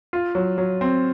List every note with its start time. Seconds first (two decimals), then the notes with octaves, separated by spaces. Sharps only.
0.13 F4
0.35 F#3
0.58 F#3
0.81 C4